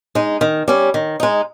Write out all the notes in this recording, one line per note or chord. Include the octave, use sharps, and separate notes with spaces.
G#3 D#4
D#3
G3 C#4
D#3
G#3 D#4